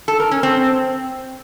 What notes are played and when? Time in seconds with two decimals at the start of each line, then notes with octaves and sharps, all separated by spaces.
0.08 A4
0.20 A#4
0.31 C#4
0.43 C4